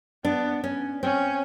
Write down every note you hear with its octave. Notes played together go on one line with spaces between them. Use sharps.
B3 D4
C#4
C4 C#4